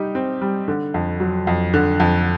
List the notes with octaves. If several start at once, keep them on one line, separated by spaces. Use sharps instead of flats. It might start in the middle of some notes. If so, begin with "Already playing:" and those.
Already playing: G3 D#4 G4
C4
G3
D3
F2
F#3
F2
D3
F2